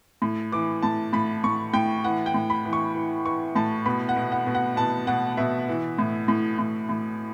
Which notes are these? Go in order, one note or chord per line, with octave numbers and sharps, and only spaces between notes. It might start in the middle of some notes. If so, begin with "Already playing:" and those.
A2
E3 D6
A2 A5
A2 B5
A2 C#6
A2 G5
E3 F#5
G5
A2
B5
E3
C#6
E3
E3 C#6
A2 A5
B2 B5
F#5
B2
F#5
B2
F#5
B2 A5
B2 F#5
B2 E5
E3
A2
A2
A2
A2